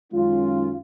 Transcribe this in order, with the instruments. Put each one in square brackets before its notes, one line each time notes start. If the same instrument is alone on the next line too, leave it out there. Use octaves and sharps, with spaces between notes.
[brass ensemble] F#2 D#3 G#3 C#4 F4